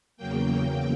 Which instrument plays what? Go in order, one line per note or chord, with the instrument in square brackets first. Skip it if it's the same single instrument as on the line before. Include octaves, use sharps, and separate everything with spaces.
[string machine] E2 C#3 F#3 A#3 G5